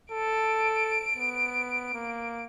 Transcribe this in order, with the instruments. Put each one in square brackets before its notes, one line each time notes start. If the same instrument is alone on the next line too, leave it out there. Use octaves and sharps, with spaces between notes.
[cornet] A4 [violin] D7
[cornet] B3
A#3